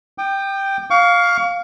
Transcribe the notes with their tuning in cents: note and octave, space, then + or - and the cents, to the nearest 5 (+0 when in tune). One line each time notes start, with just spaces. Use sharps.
G5 +0 D6 +45
F5 +10 C#6 +40